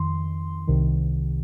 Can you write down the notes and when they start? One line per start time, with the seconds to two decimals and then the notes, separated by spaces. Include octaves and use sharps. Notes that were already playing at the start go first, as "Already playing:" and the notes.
Already playing: F2 D#3 C6
0.68 C2 C3 D#3